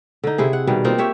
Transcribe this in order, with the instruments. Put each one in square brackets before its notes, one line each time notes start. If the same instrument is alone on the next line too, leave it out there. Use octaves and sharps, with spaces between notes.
[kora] D3 D#4
C3 E4 G#4
F#5
B2 D#3 G3
A#3 C4 D#4 F4
G4 C#5 E5